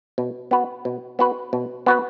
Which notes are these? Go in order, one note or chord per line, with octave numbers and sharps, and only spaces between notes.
B2
B3 F#4 B4
B2
B3 F#4 B4
B2
B3 F#4 B4